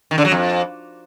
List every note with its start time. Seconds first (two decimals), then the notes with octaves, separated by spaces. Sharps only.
0.11 D#3
0.18 D3
0.25 F#3
0.32 F2